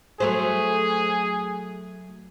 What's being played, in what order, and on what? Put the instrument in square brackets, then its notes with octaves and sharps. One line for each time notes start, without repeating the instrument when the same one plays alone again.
[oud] F#3 A3 C5 [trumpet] G#4